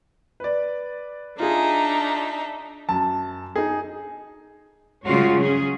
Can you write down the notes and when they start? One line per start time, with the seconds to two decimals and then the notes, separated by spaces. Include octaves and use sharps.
0.40 B4 D5
1.40 D4 D#4 F4 G#4 E5
2.89 F#2 A5
3.56 D#4 G#4
5.05 C#3 G3 G#3 F4 F#4 C#5
5.41 F#3 C#4 G#4